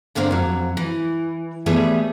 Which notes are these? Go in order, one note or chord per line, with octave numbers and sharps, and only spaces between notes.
G2 D3 A#3 C4 D4
F2 F#3
E3
E3 G3 A3 B3 G#4 C#5